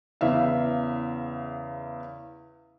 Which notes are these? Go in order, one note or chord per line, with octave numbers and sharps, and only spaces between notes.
E2 C#3 B4 E5 F5